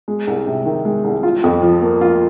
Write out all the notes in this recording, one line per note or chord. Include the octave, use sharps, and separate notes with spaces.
G#3
C2
C3
D#3
G#3
C2
F4
F2
F3
A#3
F4